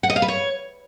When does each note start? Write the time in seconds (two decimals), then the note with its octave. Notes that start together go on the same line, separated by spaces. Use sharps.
0.03 F#5
0.10 D#5
0.16 F5
0.22 B4
0.28 C#5